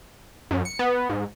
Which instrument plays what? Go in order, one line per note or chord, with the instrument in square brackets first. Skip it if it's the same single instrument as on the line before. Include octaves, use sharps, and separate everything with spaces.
[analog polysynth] F#2
C#7
B3
G#2